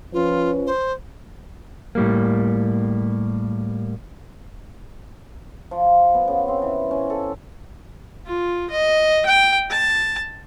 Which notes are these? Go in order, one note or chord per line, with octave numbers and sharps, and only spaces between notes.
F3 C#4 F4 B4
C5
A2 G3 A#3
F3
B3
C#3
C4
E3
C#4
A4
F4
D#5
G5
A5